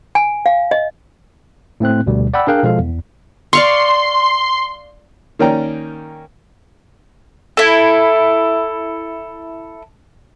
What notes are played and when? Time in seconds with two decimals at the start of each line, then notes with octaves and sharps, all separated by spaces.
0.15 G#5
0.46 F5
0.71 D#5
1.80 A2 A3 C4 F#6
2.06 D2 B2 G3
2.34 D5 F#5 G5 B5 E6
2.47 D4 G#4 A#4 F5 G5 F#6
2.63 B2 F3 G#3 A4 F5
2.79 E2
3.53 D5 F5 C6 C#6
5.39 D#3 A#3 C#4 D5 G5 A#5
7.57 E4 A4